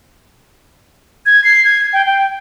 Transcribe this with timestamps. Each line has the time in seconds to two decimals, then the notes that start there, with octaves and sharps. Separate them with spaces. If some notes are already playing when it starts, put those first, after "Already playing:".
1.26 G#6
1.44 C7
1.65 G#6
1.93 G5
2.06 G5